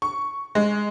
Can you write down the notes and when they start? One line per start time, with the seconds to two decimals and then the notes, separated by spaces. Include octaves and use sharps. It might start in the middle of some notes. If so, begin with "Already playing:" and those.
0.02 C#6
0.55 G#3